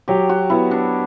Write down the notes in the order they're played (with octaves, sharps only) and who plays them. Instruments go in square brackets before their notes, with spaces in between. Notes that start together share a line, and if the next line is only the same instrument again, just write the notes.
[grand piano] F#3 [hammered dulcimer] G4
[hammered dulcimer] F#4
[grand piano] B3 [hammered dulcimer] E4
[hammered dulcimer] D4